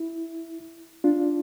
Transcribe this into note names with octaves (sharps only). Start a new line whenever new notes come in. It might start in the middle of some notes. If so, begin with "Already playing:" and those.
Already playing: E4
D4 F4